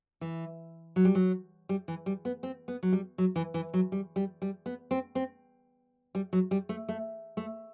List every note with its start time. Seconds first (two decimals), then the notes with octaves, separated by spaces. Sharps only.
0.21 E3
0.96 F#3
1.05 G3
1.15 F#3
1.69 G3
1.88 E3
2.06 G3
2.25 B3
2.43 C4
2.68 B3
2.83 F#3
2.92 G3
3.18 F#3
3.36 E3
3.54 E3
3.74 F#3
3.92 G3
4.16 G3
4.42 G3
4.66 B3
4.91 C4
5.15 C4
6.15 G3
6.33 F#3
6.51 G3
6.69 A3
6.89 A3
7.37 A3